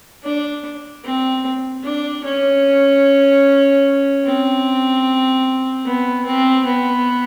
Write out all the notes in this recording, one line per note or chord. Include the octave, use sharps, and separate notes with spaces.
D4
C4
D4
C#4
C4
B3
C4
B3